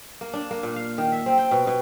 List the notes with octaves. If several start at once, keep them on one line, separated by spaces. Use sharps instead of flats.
A#3
D4
A#3
A#2
F5
D#3
E5
C4
G5
B2
B2